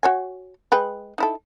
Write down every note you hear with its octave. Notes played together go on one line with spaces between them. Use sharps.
F#4 C#5 G#5
G#3 B4 G5
D#4 E4 A4